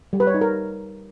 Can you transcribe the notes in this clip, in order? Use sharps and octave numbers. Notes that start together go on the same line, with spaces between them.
G3
B4
C#5
D#4
A#4